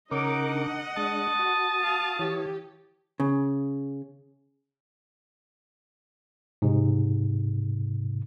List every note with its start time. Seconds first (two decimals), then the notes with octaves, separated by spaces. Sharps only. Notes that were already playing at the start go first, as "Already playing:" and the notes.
0.11 C#3 D#4 A#4 C#5 D#5 F#5 D6
0.47 D4
0.97 G#3 D4 A5 D#6
1.39 F#4
1.83 F5
2.19 E3 G4 C#5
3.20 C#3
6.62 G#2 C3